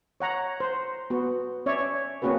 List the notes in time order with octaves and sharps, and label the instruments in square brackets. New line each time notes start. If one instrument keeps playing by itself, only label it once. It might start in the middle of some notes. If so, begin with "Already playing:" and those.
[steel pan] C#5 F#5 A#5
C5
B3 F#4
C#4 C#5 D5 E5
A#3 C4 C#4 F#4 G#4 B4